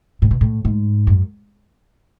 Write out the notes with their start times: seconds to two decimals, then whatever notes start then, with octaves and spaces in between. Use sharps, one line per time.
0.22 A2
0.31 B2
0.41 A2
0.65 G#2
1.07 F#2